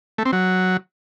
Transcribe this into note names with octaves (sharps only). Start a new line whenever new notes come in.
A3
C4
F#3